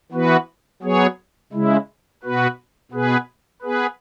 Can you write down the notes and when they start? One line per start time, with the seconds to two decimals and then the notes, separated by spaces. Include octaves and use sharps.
0.12 E3 B3 F#4 B4
0.82 F#3 B3 G#4 C#5
1.52 C#3 G#3 E4
2.23 B2 B3 F#4 B4
2.92 B2 B3 G#4 B4
3.62 B3 G#4 B4